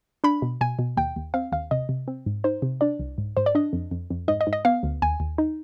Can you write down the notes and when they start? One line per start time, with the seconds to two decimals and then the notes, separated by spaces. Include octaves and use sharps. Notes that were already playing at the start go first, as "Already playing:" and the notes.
0.24 D4 B5
0.42 B2
0.61 B2 G#5
0.79 B2
0.97 D#2 G5
1.16 D#2
1.34 C4 F5
1.52 D#2 F5
1.71 C3 D#5
1.89 C3
2.08 C4
2.26 G#2
2.44 D#4 C5
2.62 C3
2.81 D4 D5
2.99 C2
3.18 G#2
3.37 G#2 C5
3.46 D5
3.55 D4 D#5
3.73 F2
3.91 F2
4.10 F2
4.28 G#2 D#5
4.41 D#5
4.47 G#2
4.53 D#5
4.65 B3 F5
4.83 D2
5.02 D#2 G#5
5.20 D#2
5.38 D#4